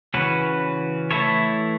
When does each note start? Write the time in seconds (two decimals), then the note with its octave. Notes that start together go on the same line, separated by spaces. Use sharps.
0.14 C#3 E3 C#4 F#4 B4
1.11 E3 A3 E4 A4 C#5